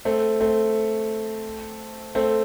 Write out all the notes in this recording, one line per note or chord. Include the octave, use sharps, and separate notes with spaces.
A3 C4
A3 C4
A3 C4